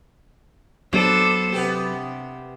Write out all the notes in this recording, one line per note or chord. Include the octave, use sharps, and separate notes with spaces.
F#3 B3 D4 A4 C5
C3 B3 G4